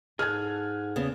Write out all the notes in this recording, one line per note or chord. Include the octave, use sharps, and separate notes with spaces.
G#2 G#4 A4 F6 F#6 G#6
E2 C#3 B3